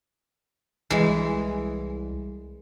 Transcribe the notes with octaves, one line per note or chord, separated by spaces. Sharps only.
C2 E3 G#3